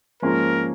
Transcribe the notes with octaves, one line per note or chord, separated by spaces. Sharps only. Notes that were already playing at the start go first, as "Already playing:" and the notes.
G#2 F3 A#3 C#4 F4 A#4